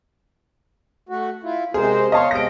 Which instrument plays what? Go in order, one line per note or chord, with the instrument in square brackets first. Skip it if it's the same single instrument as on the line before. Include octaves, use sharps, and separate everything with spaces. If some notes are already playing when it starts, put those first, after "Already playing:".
[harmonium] A3 F#4
E4 F4
[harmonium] C3 G#3 C5 [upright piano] G#4 A#4
[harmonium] C#5 F5 [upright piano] D#5 A5 C6
[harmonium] C3 G#3 D#5 [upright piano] A#6 D7